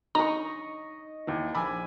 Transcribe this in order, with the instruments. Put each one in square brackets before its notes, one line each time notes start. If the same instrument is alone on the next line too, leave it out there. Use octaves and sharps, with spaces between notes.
[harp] D#4 [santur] D#5 C#6 [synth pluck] A#5
[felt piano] D#2 E3
[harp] A#1 G#5 [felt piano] B5 D6 E6